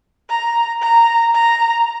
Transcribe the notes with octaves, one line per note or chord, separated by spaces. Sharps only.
A#5
A#5
A#5